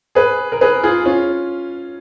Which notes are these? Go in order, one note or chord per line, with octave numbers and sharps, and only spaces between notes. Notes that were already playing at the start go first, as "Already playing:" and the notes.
G#4 B4
A#4
G#4 B4
F4 G#4
C#4 F4